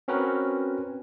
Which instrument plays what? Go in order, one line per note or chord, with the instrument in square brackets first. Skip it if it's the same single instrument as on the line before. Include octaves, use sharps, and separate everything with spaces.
[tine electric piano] C4 C#4 F#4 A#4 B4